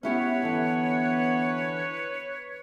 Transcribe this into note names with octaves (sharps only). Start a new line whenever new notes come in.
B3 C#4 E4 G4 B4 C#5
D3 E3